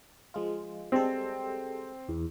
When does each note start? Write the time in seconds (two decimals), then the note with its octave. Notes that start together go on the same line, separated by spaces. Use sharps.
0.34 F3 G#3 F4
0.92 G3 G#3 C4 A4
2.09 E2